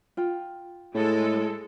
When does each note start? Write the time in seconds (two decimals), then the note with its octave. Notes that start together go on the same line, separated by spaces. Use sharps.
0.17 F4 G5
0.94 A2 G#3 A4